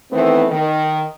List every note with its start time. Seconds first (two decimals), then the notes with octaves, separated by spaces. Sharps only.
0.12 D#3 E3 A3 B3 C4
0.50 D#3